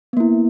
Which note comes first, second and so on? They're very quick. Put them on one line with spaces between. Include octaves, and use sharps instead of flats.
B3 A#3 E4